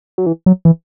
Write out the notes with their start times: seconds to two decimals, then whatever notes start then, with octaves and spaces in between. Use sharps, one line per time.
0.18 F#3
0.26 E3
0.46 F#3
0.65 E3